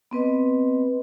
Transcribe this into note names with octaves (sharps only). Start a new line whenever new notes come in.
B3 C4 B4 D#5